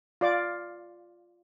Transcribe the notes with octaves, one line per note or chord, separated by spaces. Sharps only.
F4 D5 D6